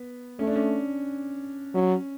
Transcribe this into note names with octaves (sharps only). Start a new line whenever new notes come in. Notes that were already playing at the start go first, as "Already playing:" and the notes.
Already playing: B3
A3 C#4
D4
C#4
F#3 C#4